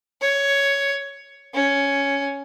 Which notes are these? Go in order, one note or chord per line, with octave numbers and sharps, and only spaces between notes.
C#5
C#4